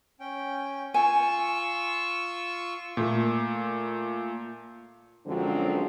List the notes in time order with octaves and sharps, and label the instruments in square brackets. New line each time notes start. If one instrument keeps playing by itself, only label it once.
[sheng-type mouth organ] C#4 G5
[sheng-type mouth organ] F4 C#6 E6 [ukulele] G#5
[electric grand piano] A#2 A3
[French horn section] F#2 D3 F3 F#3 G#3 C4